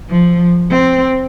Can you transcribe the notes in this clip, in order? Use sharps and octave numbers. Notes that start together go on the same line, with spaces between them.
F3
C4